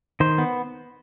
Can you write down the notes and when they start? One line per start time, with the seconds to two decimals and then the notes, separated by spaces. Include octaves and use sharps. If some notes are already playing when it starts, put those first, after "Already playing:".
0.20 D#3 C5
0.38 B3